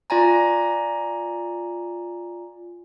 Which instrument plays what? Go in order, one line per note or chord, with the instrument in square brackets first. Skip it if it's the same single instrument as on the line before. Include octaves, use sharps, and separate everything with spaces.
[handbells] F4 D5 G#5 A#5